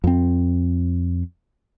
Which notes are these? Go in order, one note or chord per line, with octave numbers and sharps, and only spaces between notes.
F2 C4